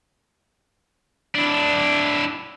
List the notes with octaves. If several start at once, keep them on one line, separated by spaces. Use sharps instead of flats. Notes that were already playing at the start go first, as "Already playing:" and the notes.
D4 E4